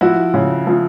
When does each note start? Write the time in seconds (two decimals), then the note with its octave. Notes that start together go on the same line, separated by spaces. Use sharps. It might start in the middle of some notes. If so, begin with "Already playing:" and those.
0.01 F3 E4 F#4
0.34 C#3
0.67 F3